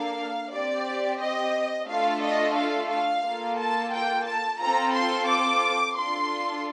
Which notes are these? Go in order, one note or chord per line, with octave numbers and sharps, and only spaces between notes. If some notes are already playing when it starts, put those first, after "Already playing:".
Already playing: A#3 D4 A4 F5
C4 G4 D5
D#5
A3 D4 F4 A4 F5
D#5
F5
F5
A#3 F4 A4
A5
G5
A5
C4 F4 A4 A#5
C6
D6
D4 F4 A4 C6